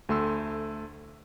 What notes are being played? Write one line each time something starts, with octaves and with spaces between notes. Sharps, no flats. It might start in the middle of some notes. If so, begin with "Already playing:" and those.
D2 A3 C6 E6